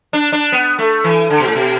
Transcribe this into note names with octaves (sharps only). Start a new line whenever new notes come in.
D4
D4
B3
A3
E3
D3
B2
A2
B2